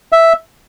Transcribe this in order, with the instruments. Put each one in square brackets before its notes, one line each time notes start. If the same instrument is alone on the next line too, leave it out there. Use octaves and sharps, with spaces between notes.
[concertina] E5